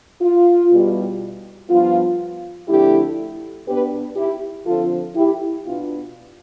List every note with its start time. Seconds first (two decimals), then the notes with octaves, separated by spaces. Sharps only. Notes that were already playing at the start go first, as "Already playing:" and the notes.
0.22 F4
0.72 E2 B2 G3
1.70 G2 F3 B3 F4
2.68 F2 D3 A3 E4 G4
3.67 B2 B3 D4 G4 B4
4.16 E4 G4
4.66 D3 F3 C4 F4 A4
5.15 E4 G4
5.64 B2 B3 D4 F4